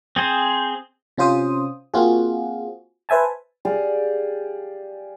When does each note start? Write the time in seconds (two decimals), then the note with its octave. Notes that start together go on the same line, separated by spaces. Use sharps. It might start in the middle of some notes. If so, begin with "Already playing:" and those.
0.16 C4 G#4 C5
1.18 C3 C#4 F4 C5 D#6
1.94 A#3 C4 F4 F#4 G#4
3.09 B4 C5 E5 G#5 A5
3.65 G4 G#4 D5 F5